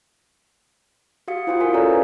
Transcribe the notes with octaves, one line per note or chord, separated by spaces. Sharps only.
F#4 G4 F5 D#6 C#7
E4 F4 C5 G5 C6 D#6
E4 F4 A#4 F5 G#5
C#4 G4 A4 C#5 D5 A#5
B4